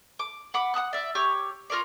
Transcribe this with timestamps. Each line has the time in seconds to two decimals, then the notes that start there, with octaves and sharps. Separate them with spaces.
0.19 D6
0.54 F#5 B5 D6
0.74 F#5 A5 D#6 F#6
0.93 D5 E5
1.15 G4 C#5 C#6 E6
1.70 F4 A#4 C#5 D5